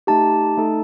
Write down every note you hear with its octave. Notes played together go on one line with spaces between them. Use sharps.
A3 D#4 G4 A5
A3 D#4 A4